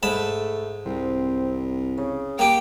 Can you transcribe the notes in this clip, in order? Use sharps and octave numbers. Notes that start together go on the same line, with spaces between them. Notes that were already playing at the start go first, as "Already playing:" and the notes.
G#2 A3 A5 B5
C2 C4
C#3
A#3 G4 G5